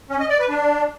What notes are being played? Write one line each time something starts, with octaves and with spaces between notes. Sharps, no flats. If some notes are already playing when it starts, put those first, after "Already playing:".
C#4
D#5
D5
B4
D4